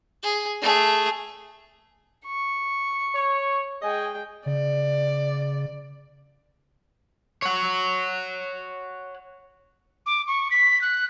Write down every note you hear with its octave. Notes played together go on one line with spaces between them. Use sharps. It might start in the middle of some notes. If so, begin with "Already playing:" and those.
G#4
A3 G#4
C#6
C#5
G#3 D#5 G5 G#5
C#3 D5
C#5 F#5
D6
C#6
B6
F#6